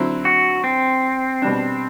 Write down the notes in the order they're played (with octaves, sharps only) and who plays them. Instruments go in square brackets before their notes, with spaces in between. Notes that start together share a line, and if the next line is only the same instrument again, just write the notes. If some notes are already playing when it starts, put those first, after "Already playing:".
Already playing: [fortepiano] D3 F#3 C4 E4
[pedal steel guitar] F#4
C4
[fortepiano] B2 G3 D4